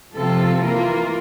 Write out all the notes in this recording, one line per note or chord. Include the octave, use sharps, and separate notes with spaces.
C3 F3 C4 F4 A4
E3 A#3 F4 A#4